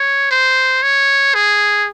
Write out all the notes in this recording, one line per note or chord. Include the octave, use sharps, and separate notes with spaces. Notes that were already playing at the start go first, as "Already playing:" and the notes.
Already playing: C#5
C5
C#5
G#4